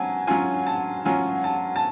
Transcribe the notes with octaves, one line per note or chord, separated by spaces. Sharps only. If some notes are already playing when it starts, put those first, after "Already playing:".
Already playing: F#3 C#4 G#5 A5
F#3 C#4 F4 G#5
A5
F#3 C#4 F4 G#5
A5
A5